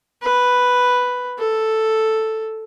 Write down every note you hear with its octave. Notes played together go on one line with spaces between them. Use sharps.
B4
A4